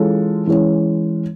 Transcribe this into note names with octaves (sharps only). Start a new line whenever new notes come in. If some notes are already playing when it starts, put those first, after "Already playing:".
Already playing: E3 G#3 C#4 F4 A4
E3 G#3 C#4